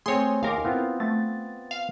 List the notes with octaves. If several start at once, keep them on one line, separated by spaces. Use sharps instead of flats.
A3 C4 G#4 C#5 C6 D#6
D#2 A#4 F5 G#5 C6 D6
B3 C4 E4 F4
A3 A6
F5